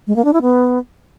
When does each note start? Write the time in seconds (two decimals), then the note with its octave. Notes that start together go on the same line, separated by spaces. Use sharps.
0.07 G#3
0.16 A#3
0.24 D4
0.33 E4
0.42 B3